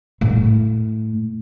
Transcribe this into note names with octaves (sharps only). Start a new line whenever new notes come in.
A2